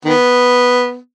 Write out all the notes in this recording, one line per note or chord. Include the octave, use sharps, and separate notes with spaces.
D#3 B3